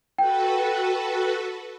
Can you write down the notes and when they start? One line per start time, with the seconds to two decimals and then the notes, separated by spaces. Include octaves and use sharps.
0.18 F#4 A4 B4 G5